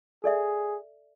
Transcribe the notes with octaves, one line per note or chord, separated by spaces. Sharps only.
G#4 A4 D5 E5